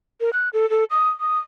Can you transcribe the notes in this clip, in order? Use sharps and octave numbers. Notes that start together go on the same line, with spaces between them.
A#4
F#6
A4
A4
D#6
D#6